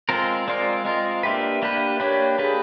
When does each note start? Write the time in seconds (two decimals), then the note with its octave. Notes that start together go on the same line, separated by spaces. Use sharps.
0.09 G#3 C4 F4 A#4
0.47 G#3 C4 F4 A#4 D5
0.85 G#3 C4 F4 A#4 D#5
1.23 A#3 D4 G4 B4 E5
1.62 A#3 D4 G4 B4
1.99 A#3 D4 G4 B4 C#5
2.39 A#3 D4 G4 G#4 B4